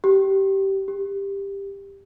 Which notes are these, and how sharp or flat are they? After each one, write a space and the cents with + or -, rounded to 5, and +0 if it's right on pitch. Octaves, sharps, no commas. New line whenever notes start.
G4 -15
G4 +15